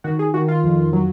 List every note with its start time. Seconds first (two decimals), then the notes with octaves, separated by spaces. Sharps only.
0.04 D#3 F#4
0.19 G#4
0.34 D#3 F#4
0.48 F4
0.64 F2
0.93 F#3